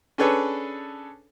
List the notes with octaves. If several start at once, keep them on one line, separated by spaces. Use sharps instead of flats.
C#4 D4 G#4 A4 B4 C#5